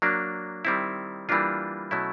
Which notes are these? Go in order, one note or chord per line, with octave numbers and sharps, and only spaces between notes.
F#3 A#3 D4
D#3 G3 C4 E4
E3 G3 A#3 D4 F4
B2 F#3 A3 C#4 E4